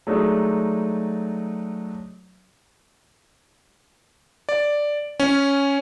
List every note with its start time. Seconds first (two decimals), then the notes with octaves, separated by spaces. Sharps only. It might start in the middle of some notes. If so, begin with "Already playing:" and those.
0.07 F#3 G#3 A3 D4 D#4
4.49 D5
5.20 C#4